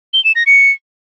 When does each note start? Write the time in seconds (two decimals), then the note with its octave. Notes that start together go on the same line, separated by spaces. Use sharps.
0.13 G7
0.24 E7
0.35 A#6
0.46 C#7